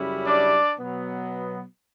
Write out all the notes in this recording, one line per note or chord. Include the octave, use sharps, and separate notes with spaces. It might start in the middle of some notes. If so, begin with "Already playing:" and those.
Already playing: F#2 C#3 G3 C#4 E4
D4 D5
B2 F#3 B3